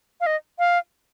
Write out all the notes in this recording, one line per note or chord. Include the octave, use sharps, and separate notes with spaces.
F5
D#5
F5